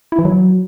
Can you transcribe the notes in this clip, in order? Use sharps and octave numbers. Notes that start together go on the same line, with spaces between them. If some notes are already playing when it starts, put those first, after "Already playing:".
E4
E3
F#3